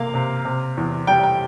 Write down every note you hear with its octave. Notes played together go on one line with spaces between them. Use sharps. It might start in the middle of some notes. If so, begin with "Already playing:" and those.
Already playing: C3 A#3 F5
C3
C3
E2
G3 G5
G5